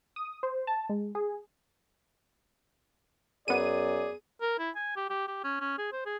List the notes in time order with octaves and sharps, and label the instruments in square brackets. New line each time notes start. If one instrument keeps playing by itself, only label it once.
[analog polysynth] D#6
C5
A5
G#3
G#4
[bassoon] F#2 [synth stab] B3 D#7 [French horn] G#4 [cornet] D5
[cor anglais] A#4
E4
G#5
G4
G4
G4
C#4
C#4
G#4
C5
G#4